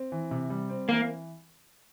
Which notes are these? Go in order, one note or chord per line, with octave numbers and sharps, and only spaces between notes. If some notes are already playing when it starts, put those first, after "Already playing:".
Already playing: C4
E3
C3
G3
C4
E3 A#3